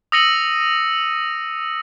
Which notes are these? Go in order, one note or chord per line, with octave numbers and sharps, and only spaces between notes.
D#6 E6 A#6 C#7 D#7 F#7